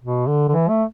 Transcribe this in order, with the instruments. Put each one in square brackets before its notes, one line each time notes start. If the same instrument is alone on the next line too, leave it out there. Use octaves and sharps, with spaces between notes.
[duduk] B2
D3
D3
E3
A3